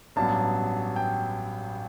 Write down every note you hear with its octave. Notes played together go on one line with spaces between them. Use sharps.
A1 G2 F#3 B3 A5
G5